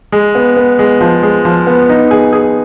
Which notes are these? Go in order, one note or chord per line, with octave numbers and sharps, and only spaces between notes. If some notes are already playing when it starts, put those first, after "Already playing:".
G#3
B3
B3
G#3
F3
G#3
F3
B3
D#4
G#4
G#4